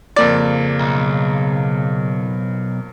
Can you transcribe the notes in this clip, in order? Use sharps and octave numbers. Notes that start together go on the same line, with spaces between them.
F2 C#3 A#3 D5 A6
B1